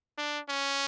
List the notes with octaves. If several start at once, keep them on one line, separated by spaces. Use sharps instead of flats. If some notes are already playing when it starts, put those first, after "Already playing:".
D4
C#4